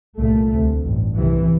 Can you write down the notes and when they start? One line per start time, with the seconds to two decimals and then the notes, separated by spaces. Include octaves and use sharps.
0.19 C2 A#2 A3
0.52 D2 C3
0.84 A1 G2
1.17 C2 C3 E3